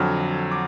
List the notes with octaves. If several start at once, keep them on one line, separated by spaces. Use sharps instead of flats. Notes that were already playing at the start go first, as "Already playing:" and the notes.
Already playing: F2 D3 F#3 F6
D6